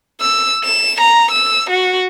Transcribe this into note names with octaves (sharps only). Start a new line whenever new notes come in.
E6
E7
A#5
E6
F#4